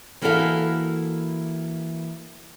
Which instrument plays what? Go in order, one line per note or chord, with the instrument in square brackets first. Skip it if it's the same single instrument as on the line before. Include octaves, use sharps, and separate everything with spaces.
[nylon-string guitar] E3 A#3 E4 F#4 A4 F5